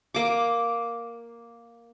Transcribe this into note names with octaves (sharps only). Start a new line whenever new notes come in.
A#3 D6